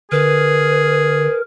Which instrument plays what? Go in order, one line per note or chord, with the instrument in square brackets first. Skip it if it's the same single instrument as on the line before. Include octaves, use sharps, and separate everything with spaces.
[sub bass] D3 [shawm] G#4 [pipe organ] A#4 [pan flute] B4